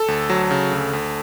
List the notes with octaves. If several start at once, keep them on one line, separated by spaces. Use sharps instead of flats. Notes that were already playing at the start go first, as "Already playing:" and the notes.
Already playing: A4
D2
F#3
C#3
D2
D2